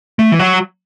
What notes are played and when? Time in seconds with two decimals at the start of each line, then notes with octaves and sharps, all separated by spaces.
0.19 A3
0.32 E3
0.39 F#3